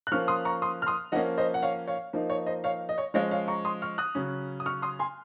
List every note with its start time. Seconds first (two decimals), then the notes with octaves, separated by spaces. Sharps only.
0.07 F#6
0.12 F3 A#3 C#4 C#6 F6
0.28 C6 D#6
0.45 A#5 C#6
0.62 C6 D#6
0.82 F6
0.87 C6 D#6
1.12 F3 A#3 C#4 D#5 F#5
1.37 C5 D#5
1.54 F#5
1.62 C#5 F5
1.88 C#5 F5
2.13 F3 A#3 D#4
2.30 C#5
2.46 C5 D#5
2.64 C#5 F5
2.89 D#5
2.98 C#5
3.14 F3 G#3 C#4 C#5 F5
3.31 C#5 F5
3.48 A#5 C#6
3.65 C6 D#6
3.82 C#6 F6
3.98 D#6 F#6
4.15 C#3 F#3 C#4
4.60 D#6
4.66 C#6 F6
4.82 C6 D#6
4.99 G#5 C6